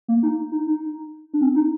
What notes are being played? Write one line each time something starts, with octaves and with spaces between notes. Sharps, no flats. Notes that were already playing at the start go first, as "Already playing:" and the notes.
A#3
D#4
D#4
D#4
D4
C4
D#4